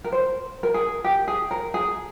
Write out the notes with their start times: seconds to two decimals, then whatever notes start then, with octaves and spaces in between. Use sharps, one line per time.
0.04 A#4
0.12 C5
0.63 A#4
0.74 G#4
1.04 G4
1.28 G#4
1.51 A#4
1.74 G#4